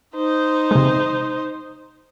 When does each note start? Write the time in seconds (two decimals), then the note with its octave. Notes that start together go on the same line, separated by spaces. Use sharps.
0.15 D#4 C5
0.71 C3 G#3